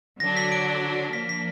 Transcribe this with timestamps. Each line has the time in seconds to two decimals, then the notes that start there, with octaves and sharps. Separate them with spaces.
0.20 D3 F#3 D4 A#6
0.37 B6
0.52 D7
1.13 F3 A#3 D4 B6
1.29 B6